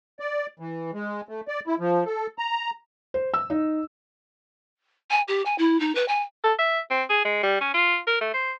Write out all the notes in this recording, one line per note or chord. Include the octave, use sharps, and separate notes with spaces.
D5
E3
G#3
A3
D5
E4
F3
A4
A#5
C5
E6
D#4
G#5
G4
G#5
E4
D#4
B4
G#5
A4
E5
C4
G#4
G#3
G3
C#4
F4
A#4
A3
C5